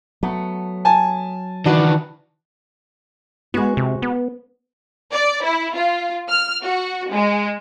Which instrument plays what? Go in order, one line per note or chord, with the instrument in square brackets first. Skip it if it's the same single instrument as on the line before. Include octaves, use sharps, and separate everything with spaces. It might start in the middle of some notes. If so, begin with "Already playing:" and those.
[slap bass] F#3 [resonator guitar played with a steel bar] A3 B3
[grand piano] G#5 A5
[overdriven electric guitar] D#3 E3 [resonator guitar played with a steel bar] D4 F#4 B4
[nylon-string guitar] G#3 F#4 [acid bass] B3
[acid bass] C3
B3
[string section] D5
E4
F4
F6
F#4
G#3